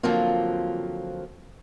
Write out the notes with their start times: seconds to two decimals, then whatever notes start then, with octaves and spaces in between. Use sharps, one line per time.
0.03 D3 F3 F#3 A#3 C4 F4